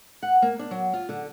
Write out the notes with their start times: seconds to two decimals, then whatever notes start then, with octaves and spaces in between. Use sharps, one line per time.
0.23 F#5
0.42 A#3
0.59 D4
0.71 F#3
0.93 F4
1.09 D3